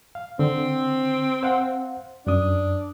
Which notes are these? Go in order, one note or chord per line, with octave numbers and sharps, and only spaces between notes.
F5
D3 C4
C5 F5 F#5
F#2 D4 D#6